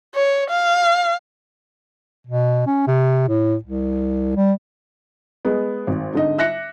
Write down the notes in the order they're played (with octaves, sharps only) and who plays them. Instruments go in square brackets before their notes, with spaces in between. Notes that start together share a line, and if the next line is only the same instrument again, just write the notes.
[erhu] C#5
F5
[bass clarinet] B2
C#4
C3
A2
C2
G3
[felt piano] G#3 B3
G#1
G#2 D3 D#5
E5 F#6 A#6 C#7